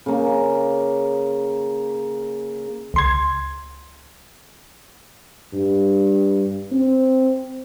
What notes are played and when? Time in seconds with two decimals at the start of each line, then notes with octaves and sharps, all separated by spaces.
0.06 C#3 A#3
2.94 C#2 C6 G#6
5.53 G2
6.72 C4